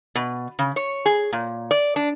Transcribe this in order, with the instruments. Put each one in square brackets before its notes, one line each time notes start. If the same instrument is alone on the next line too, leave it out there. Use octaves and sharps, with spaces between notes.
[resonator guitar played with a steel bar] B2
C#3
C#5
G#4
A#2
D5
D4